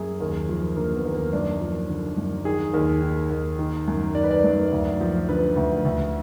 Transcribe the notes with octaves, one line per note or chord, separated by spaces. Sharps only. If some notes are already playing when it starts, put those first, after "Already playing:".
Already playing: F#2 G#4
D#2
F3
D3 A#3
B3
D#2
A#3
F#2 D4
F3
D3
F#2
D#3 G#4
D#2
D#3
D#2
D#3
F#2
D#3 D5
B4
D5
F#2
D2
F3
D3 B4
D2
D2